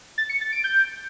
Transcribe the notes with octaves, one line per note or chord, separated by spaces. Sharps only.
A6
C#7
A6
D7
G6